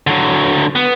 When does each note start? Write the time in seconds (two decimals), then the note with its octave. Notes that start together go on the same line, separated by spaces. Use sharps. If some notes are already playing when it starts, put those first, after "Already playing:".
0.07 D3 F#3
0.75 B3